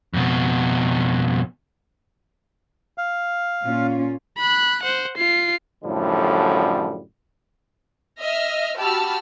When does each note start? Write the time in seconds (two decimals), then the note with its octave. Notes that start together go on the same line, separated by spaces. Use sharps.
0.14 F2 B2
2.98 F5
3.64 A#2 C#4 F4
4.38 B5 F#6
4.83 C5 F#5
5.18 F4 C7
5.84 F#2 A2 D3 F3 G3
8.18 D#5 E5 F6
8.76 F#4 G4 A5 B5 E6 F6